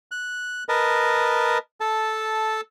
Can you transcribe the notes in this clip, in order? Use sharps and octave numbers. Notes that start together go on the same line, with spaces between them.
F#6
A#4 B4 D#5 A5
A4 A5